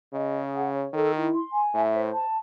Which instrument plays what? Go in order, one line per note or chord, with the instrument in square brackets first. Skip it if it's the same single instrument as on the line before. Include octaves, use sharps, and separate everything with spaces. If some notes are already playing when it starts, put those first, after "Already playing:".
[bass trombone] C#3 [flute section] D#5
[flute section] G#4
F#5
C#5
[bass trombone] D#3 [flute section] A4
[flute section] E4
C6
G#5
[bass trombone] A2 [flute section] E5
[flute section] C5
A5